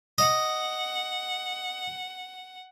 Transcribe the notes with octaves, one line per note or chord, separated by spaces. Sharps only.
D#5 F#5